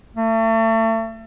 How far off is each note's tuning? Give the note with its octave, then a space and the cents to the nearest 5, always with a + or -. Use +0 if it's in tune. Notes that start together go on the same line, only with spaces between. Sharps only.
A3 +35